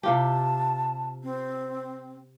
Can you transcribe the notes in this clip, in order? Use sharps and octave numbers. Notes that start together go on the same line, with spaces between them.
C3 F4 G4 A5
C4